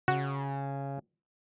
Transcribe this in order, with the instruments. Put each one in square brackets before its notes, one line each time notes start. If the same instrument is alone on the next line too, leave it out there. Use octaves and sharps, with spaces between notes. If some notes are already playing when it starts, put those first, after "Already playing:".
[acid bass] C#3 [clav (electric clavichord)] F#4